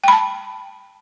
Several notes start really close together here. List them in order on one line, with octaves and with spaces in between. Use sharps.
G5 B5 A5